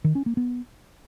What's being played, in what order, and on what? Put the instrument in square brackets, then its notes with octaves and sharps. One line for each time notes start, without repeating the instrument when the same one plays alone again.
[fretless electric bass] D#3
C#4
A#3
B3